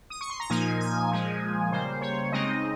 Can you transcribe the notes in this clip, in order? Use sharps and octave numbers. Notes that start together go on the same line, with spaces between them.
D#6
C#6
C6
A#5
A#2 F3 A#3 D#4 G#5
G#5
A#2 F3 G#3
C#3 G3 A#3 C5
C#5
C#3 G#3 C4 D#4 D#5